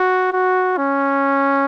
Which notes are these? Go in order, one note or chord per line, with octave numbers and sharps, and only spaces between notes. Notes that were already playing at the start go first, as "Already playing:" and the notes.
Already playing: F#4
F#4
C#4